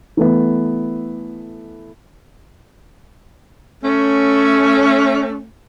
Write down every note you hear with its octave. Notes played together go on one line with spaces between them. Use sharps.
E3 A3 B3
A3 C#4